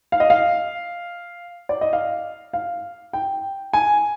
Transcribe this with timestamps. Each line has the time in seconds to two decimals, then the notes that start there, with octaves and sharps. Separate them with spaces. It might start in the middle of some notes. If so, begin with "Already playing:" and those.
0.12 F5
0.20 D#5
0.30 F5
1.69 D5
1.81 D#5
1.93 F5
2.53 F5
3.13 G5
3.73 G#5